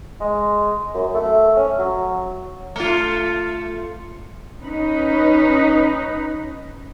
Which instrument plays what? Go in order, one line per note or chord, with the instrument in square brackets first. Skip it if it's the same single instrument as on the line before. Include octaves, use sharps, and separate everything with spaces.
[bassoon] G#3
F#2
A3
C#4
F#3
[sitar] A3 F4
[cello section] C#4 D#4 B4